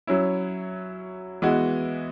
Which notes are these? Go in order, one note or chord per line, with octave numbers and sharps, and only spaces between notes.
F#3 C#4 E4
E3 G#3 B3 F#4